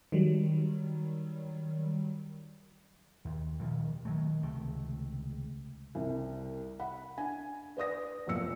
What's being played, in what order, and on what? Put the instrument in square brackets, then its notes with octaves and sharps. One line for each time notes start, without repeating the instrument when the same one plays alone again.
[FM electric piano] D#3 F#3 G3
[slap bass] D#2
A#2 D#3 F3 G3
D#3 F#3 A3
C#2 C3 D#3 A3
[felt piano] C2 C3
F#5 B5
D4 G#5
B4 D5 D#6 A#6
F1 B1 A#2 A#3 E6 C#7